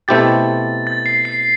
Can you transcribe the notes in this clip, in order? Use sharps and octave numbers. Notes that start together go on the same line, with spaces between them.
B2 A3 C4 E4 G4 A6
A6
C7
C7